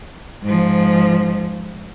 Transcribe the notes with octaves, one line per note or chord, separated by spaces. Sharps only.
G#2 F3